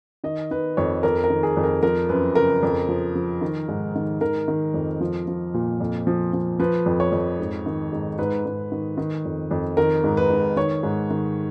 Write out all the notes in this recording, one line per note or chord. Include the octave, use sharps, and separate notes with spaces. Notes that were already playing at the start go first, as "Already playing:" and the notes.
D#3 D#5
D#3 B4
F2 C#5
F2 A#4
A#4
D#3
G#4
F2
A#4
F3 A#4
F#2 B4
C#3 A#4
F2
F3
F3
D#3
G#2
D#3
D#3 A#4
D#3
F2
F3
F3
A#2
F2
F3
F3
F3 B4
F2
C#5
F2
G#2
D#3
G#2
G#2 B4
G#2
D#3
D#3
F2
F2
D#3 A#4
G#2
B4
G#2
D#3 C#5
G#2
D#3